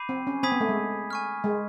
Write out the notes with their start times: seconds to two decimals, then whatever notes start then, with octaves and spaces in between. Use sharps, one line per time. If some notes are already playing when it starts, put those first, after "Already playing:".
Already playing: B5 D6 G6 C7 D#7
0.09 C4
0.27 C#4
0.43 C4 G#5 B5 D#6 G#6 B6
0.52 B3
0.60 A3
0.69 G#3
1.11 G#5 C#6 F6
1.44 G#3